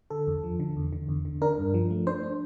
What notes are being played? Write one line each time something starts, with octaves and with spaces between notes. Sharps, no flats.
D3 A4
E2
F3
D3
E2
D3
E2
D3
D4 A#4
G2
F3
A3
D4 C5
D4